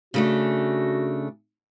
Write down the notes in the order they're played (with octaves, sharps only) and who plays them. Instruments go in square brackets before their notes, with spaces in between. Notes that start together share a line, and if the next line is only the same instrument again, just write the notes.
[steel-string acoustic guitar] C#3 A3 D4 [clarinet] F#4